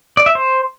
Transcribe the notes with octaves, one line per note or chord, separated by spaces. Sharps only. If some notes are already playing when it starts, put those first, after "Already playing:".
D5
E5
C5